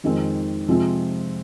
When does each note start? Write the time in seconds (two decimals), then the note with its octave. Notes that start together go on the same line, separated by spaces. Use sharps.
0.04 F2 D#3 G#3 C4
0.68 C3 F3 G#3 C4